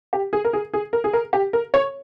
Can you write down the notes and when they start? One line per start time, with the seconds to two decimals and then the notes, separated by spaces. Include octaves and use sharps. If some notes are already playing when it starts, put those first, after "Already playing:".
0.13 G4
0.33 G#4
0.45 A#4
0.53 G#4
0.73 G#4
0.93 A#4
1.04 G#4
1.13 A#4
1.33 G4
1.53 A#4
1.74 C#5